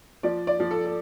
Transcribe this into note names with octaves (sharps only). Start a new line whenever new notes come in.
F3 D5
D5
F3
A4
A4